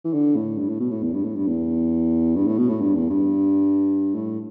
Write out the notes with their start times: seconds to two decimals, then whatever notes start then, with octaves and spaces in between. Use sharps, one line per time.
0.04 E3
0.13 D3
0.36 A2
0.58 G2
0.69 A2
0.79 B2
0.91 A2
1.03 E2
1.14 G2
1.25 A2
1.36 G2
1.47 E2
2.36 G2
2.47 A2
2.58 B2
2.69 A2
2.81 G2
2.95 E2
3.10 G2
4.15 A2